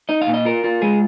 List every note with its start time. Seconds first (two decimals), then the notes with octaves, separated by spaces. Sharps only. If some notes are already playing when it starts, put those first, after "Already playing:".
0.09 D#4 D#5
0.22 F5
0.27 A#2
0.34 D#5
0.45 F4 A#4
0.64 F4
0.82 G#3 G#4